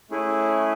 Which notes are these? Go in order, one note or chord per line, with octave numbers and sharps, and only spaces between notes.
A3 C#4 E4 G#4